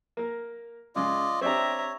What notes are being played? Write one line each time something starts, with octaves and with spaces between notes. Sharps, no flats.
A#3 A#4
C#3 G#3 F4 D5 D#5
C4 D4 G4 C#5 E5 A#5